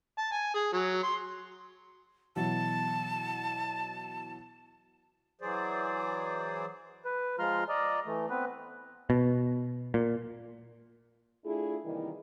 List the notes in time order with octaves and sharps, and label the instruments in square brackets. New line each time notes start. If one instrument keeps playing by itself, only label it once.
[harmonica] A5
G#5
G#4
F#3
C6
[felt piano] B2 E3 F#3 [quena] A5
[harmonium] E3 F#3 G#4 C5 D5
[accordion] B4
F3 G#3 F4 A#5 C6 F6
D5 D#5 A#5
E3 A3
B3 C4 B4
[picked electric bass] B2
A#2
[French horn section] A3 D4 E4 F4 G#4
C3 D#3 E3 G3 A#3 E4